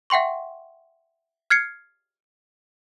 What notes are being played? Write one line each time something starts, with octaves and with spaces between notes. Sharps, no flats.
E5 F#5 G5 C6 C#6
F6 G#6 C7 C#7